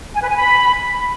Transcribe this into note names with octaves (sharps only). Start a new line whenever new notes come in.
G#5
B4
G#5
B5